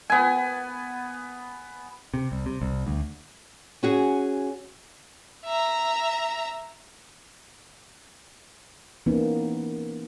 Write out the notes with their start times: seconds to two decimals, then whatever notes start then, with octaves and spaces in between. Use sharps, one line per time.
0.10 B3 G#5
2.14 C3
2.32 C2
2.46 C3
2.62 C2
2.87 D2
3.83 C#4 F#4 G#4
5.45 E5 A#5
9.06 E3 A#3 B3 C#4 D#4